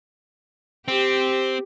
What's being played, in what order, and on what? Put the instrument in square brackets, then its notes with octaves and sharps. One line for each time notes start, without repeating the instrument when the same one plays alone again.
[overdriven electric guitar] C4 [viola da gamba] G4